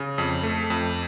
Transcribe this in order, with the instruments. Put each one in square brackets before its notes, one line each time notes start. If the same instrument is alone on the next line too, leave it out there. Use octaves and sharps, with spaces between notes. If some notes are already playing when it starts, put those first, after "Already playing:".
Already playing: [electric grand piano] C#3
F2
A3
F2